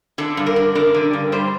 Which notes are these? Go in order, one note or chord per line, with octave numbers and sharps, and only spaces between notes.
D3 A4
G2
A#4
D3
D4 A#4
D3
G2
G3 C5